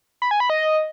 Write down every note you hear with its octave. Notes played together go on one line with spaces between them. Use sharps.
B5
G#5
B5
D#5